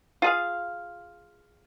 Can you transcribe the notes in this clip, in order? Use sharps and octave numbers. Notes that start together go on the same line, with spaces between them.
F4 G#4 F5